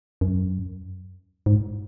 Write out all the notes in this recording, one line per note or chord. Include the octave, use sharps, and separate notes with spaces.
F#2
G#2